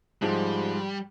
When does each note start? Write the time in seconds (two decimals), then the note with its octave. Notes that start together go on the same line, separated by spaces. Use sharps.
0.22 G#2 F3 G3 G#3